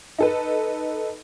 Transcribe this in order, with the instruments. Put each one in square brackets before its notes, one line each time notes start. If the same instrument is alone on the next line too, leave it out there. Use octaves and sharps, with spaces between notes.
[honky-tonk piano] D#4 A4 B4